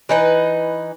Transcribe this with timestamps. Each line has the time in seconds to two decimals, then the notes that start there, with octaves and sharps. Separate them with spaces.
0.09 E3 D#4 B4